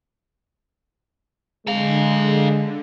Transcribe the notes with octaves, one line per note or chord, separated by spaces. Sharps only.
D3 G#3 A4 F5